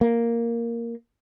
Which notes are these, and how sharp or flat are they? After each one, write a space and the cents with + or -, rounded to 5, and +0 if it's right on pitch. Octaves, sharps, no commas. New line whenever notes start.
A#3 +0